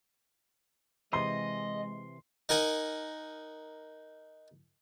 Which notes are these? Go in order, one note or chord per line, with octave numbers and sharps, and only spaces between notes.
C3 E3 G#3 D#5 C6
D#4 A#4 F#5 G#5